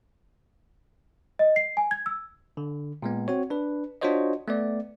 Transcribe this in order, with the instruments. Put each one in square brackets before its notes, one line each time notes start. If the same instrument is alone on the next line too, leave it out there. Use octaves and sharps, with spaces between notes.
[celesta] D#5
C7
G#5
G#6
E6
[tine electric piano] D3
A#2 G#3 B3
C4 F#4 C#5
D4 B4
D4 F4 F#4 C5 C#5 D#5
A3 B3 D5